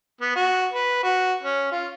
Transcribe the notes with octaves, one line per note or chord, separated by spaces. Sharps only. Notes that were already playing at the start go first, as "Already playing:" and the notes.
B3
F#4
B4
F#4
C#4
F4